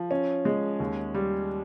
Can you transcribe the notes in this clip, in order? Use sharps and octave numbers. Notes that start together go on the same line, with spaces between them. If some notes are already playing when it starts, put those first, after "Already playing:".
Already playing: F3
C#4
G#3
D#2
G3